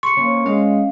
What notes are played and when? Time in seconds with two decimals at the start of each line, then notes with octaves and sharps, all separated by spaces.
0.03 C6 C#6 C#7
0.17 A#3 C#4
0.46 G#3 C#4 F5